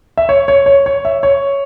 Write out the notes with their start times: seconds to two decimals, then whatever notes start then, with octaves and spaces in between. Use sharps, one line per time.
0.18 E5
0.29 C#5
0.48 C#5
0.66 C#5
0.86 C#5
1.05 E5
1.23 C#5